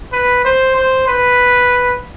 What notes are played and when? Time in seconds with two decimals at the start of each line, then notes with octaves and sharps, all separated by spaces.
0.12 B4
0.45 C5
0.76 C5
1.08 B4